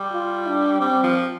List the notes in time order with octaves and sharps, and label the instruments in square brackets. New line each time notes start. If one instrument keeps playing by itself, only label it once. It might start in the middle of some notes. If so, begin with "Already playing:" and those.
Already playing: [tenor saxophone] G3
[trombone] F4
D4
[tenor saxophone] G3 [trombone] C4
[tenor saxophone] F3